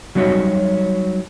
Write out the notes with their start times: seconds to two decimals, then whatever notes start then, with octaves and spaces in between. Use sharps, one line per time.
0.15 F#3 G3 D#4 F#4 C#5 E5